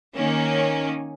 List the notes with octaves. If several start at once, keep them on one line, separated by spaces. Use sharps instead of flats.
D#3 A#3 C#4